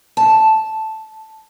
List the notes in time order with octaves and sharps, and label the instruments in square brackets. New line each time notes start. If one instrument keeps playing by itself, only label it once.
[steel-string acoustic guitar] A5